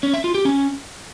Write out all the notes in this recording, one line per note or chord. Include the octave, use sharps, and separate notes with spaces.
C#4
E5
F4
G4
C#4